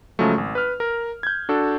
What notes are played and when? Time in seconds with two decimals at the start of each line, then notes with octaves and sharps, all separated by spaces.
0.19 C#3 F3 F#3 G#3 A3
0.38 G#1
0.55 B4 F6
0.80 A#4
1.23 G6 G#6
1.49 D4 F#4 A4